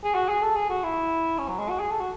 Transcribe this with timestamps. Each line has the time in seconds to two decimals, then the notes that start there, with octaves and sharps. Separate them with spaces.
0.04 G#4
0.15 F#4
0.29 G#4
0.43 A4
0.56 G#4
0.69 F#4
0.84 E4
1.38 C#4
1.48 F#3
1.59 G#3
1.69 F#4
1.80 G#4
1.90 A4
2.00 F#4